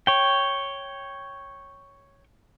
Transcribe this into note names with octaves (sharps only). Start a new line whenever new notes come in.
C#5 G5